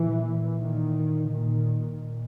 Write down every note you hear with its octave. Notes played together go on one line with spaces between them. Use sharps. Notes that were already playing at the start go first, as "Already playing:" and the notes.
Already playing: A#2 E3
A#2 D#3
A#2 D#3
A#2